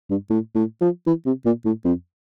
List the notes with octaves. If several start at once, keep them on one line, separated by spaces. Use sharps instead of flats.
G2
A2
A2
F3
E3
C3
A#2
A2
F2